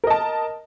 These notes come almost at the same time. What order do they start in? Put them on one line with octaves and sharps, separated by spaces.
A#4 D#5 A5